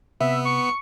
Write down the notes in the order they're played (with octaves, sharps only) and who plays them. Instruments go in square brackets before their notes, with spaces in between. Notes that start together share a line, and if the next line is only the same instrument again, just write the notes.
[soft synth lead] C3 [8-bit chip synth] B3 [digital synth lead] E5
[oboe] C#6 [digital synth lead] C#7